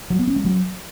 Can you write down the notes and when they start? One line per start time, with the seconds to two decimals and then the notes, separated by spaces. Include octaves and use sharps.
0.10 F#3
0.19 B3
0.27 C#4
0.36 G#3
0.45 F#3